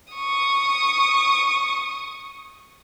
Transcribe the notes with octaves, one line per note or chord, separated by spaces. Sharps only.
C#6 D#6